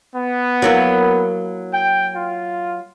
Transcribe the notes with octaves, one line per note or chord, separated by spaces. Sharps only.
B3
F#3 A#3 E4
G5
F4